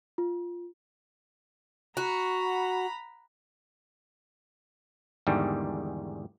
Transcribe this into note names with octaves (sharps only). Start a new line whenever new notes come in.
F4
F#4 A#5 B5
E2 G#2 D3 D#3 G3